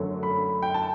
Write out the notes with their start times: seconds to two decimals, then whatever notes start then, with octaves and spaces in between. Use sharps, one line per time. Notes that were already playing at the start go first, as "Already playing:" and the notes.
Already playing: F#2 D3 F#3 A3
0.23 B5
0.62 G5
0.74 A5